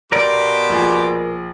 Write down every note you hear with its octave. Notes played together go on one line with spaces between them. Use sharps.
B2 G4 A#4 D5 C6 D6
A#1 G#4